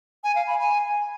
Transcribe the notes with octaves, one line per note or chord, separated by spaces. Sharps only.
G#5
F5
B5
G#5